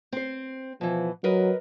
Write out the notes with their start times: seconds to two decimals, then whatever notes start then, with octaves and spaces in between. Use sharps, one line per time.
0.12 C4 C5
0.81 B2 E3 F3
1.24 F#3 A#4 B4 D#5